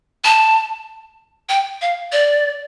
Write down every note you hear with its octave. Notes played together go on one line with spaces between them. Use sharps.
A5
G5
F5
D5